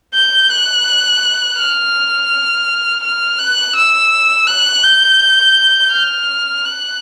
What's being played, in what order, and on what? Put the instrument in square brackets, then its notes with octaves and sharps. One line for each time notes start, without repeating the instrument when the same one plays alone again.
[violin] G6
F#6
F6
F6
F#6
E6
F#6
G6
F6
F#6